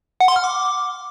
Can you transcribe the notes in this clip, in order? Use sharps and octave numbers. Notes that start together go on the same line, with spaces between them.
F#5
C6
F6
D6